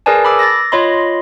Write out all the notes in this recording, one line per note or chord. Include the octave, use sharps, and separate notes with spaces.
G#4 A#4 B4 D5 G#5 A5
B5 D6 E6
A6 A#6
F4 C#5 D#5 B5 C6